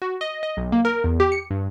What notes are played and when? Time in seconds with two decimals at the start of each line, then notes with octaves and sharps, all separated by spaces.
0.02 F#4
0.21 D#5
0.43 D#5
0.57 B1
0.72 A#3
0.85 A#4
1.04 E2
1.20 G4
1.32 C#7
1.50 G2